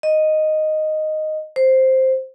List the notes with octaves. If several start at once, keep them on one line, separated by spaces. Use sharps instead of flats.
D#5
C5